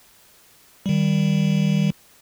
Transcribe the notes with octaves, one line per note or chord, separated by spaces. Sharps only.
D#3 G3